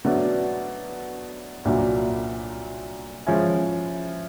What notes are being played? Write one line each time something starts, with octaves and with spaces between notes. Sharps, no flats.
B2 F#3 A3 D4
C2 A#2 F#3 A#3 D4
F3 G#3 C#4 E4